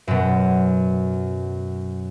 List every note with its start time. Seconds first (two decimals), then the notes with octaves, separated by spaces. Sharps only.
0.07 F#2 B2